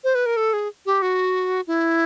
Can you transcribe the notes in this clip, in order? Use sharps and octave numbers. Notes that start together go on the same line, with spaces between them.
C5
B4
A#4
A4
G#4
G4
F#4
E4